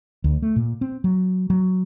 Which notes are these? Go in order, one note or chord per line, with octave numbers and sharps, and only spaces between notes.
D2
A3
A#2
C4
F#3
F#3